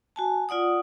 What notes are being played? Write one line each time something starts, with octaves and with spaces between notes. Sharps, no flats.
F#4 G#5 A5
F4 D5 F#5 D#6